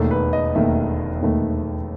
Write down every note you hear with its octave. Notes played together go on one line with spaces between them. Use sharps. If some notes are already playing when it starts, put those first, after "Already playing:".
Already playing: E1 D#2 D#3 A3 A4
B4
D#5
E1 D#2 D#3 A3 E5
E1 D#2 D#3 A3